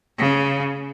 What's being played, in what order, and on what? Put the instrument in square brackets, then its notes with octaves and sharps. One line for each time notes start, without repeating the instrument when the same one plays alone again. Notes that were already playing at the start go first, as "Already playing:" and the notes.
[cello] C#3